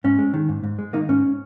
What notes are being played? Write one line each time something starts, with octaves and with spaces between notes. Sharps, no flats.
G#2 C#4
G#3
D#3
G#2
G#2
G#3
D#3 A#3 D#4
G#2 C#4